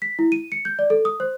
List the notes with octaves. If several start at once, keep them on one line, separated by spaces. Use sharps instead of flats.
B6
E4
D#7
C#7
G6
D5
A4
D#6
C5